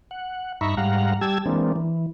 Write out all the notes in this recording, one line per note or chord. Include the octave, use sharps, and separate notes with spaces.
F#5
G2 D#4 E5 A#5 B5 C#6
G#2 G3 F5 F#5 A#5
G3 G4 A5 E6 G#6
E3 G#3 A#3 C4 D4
E3